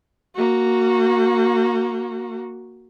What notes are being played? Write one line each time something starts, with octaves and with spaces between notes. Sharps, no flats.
A#3 F#4